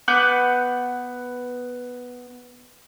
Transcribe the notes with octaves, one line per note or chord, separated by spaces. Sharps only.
B3 F#5 D6 G6